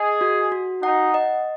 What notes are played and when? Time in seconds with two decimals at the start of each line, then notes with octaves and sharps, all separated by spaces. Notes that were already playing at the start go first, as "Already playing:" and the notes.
Already playing: G#4 D#5
0.21 F#4
0.52 F#4
0.82 D#4 F#5
1.14 D#5